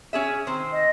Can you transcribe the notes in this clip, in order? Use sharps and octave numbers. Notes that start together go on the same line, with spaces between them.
C#4 G#4 E5
D#3 C4 C5
D#5